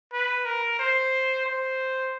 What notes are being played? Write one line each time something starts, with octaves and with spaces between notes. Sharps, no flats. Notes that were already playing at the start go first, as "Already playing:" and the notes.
B4
A#4
C5
C5